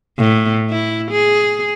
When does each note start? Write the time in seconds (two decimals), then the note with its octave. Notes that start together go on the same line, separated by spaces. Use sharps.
0.19 A2
0.70 E4
1.12 G#4